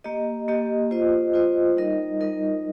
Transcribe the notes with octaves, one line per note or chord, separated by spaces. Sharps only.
A#3 G4 D#5
A#3 G4 D#5
F4 C5 D#5
F4 C5 D#5
G3 D#4 A#4 D#5
G3 D#4 A#4 D#5